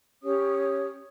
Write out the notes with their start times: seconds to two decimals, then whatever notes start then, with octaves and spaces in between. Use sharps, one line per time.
0.22 C#4 G4 C#5 D#6